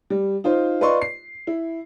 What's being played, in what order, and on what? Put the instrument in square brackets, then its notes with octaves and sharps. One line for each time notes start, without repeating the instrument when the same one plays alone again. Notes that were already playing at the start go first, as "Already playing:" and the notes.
[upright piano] G3
D#4 F4 C5
F4 B4 D5 D#5 C6 C#6
C7
E4